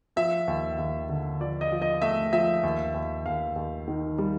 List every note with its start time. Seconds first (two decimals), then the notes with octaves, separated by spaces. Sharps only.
0.16 F3 E5
0.48 D#2
0.78 D#2
1.09 D3
1.40 F3 D5
1.61 D#5
1.72 F3
1.82 D#5
2.01 A3 E5
2.32 F3 E5
2.63 D#2
2.94 D#2
3.26 D#2 F5
3.56 D#2
3.88 D#3
4.18 G3